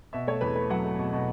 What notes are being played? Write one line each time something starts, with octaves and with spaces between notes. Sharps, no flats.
B2 E5
A3 C#5
E2 B4
A3 B4
F#3 F#5
A3
B2
B2